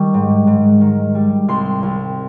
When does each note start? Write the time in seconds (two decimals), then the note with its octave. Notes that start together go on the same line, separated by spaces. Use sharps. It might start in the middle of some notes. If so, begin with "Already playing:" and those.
Already playing: D#3 G3 C#6
0.14 G#2
0.47 G#2
0.81 D#3
1.15 G3
1.48 C2 C6
1.83 C2